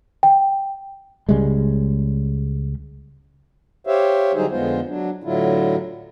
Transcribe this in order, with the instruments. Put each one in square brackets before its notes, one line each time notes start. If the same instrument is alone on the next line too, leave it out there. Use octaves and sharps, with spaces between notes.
[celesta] G5
[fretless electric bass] C#2 C#3 G3 G#3
[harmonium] G4 C5 C#5 E5 F5
D3 F#3 G3 D#4 G#4 C5
F2 D3 G#3 B3 F4 C5
F#3 D4
A2 D3 F#3 E4 F4